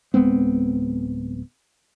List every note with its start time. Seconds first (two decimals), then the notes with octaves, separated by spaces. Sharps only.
0.14 D1 G#3 B3 C4